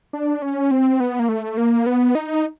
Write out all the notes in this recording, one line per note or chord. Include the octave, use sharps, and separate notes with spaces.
D4
C#4
C4
B3
A#3
A3
A#3
B3
D#4